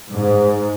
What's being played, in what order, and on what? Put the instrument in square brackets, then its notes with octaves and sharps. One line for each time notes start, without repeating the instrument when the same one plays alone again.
[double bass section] G#2